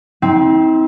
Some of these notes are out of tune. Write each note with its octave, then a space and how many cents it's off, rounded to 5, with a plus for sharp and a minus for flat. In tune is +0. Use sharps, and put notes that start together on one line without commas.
C4 +0 D#4 +45